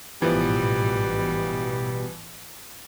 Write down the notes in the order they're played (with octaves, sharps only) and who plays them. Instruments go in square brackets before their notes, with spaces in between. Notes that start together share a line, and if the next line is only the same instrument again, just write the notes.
[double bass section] A1 G#2 [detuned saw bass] B2 [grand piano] E3 F3 B3 [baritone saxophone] G3